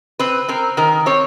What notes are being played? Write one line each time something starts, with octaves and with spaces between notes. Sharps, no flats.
C4 B4
C4 A#4
D#3 A#4
C4 C#5